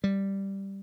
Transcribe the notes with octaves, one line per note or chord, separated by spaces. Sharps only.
G3